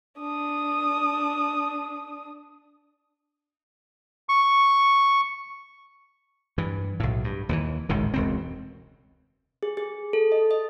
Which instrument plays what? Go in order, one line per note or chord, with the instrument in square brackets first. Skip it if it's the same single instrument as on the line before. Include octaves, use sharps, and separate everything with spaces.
[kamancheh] D4 D#6
[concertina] C#6
[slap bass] G2 E3
B1 A2
G2
D#2 D#3 E3
G#1 C#2 A2 D#3
E1 C#2 C4
[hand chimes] G#4
G#4
A4
D#5
D#5